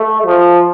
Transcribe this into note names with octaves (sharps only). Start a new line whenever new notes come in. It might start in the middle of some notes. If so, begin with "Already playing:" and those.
Already playing: A3
F3